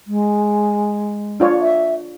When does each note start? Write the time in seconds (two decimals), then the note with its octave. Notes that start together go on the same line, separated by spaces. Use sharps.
0.06 G#3
1.40 D4 F4 C#5
1.61 E5